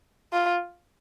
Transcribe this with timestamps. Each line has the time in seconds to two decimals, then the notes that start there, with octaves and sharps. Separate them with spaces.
0.33 F4